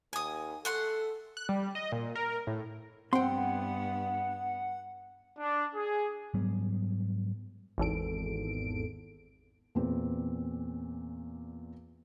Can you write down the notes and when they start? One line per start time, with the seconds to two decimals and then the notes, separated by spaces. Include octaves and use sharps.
0.13 D#2 G#5 D#6
0.65 A3 A4 F#5 C6
1.37 F#6
1.49 G3
1.75 D#5
1.92 A#2
2.15 A#4
2.47 A2
3.13 G2 B3 C4 F#5 G5 C6
5.39 D4
5.75 G#4
6.34 G#2 F#3 G3 B3
7.78 G#1 E2 A4 D7
9.75 E2 A#2 C4